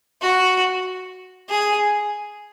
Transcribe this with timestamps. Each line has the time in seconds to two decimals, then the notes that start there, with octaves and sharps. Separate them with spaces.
0.22 F#4
1.49 G#4